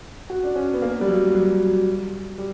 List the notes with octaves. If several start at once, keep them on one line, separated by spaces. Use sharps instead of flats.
F#4
D4
C#4
B3
A#3
G3
F#3
F#3
G3